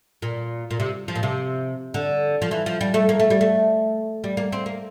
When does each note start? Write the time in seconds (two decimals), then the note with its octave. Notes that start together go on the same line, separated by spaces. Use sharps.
0.22 A#2
0.71 A#2
0.80 C3
1.08 F3
1.15 A#2
1.23 C3
1.94 D3
2.42 F3
2.51 E3
2.66 F3
2.81 G3
2.94 A3
3.09 A#3
3.20 A3
3.30 G3
3.41 A3
4.24 G3
4.37 A#3
4.52 C4
4.66 A#3